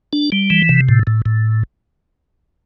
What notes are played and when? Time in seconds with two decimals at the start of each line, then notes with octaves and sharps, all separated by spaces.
0.13 D4
0.32 G3
0.50 E3
0.69 C3
0.89 A2
1.07 A2
1.26 A2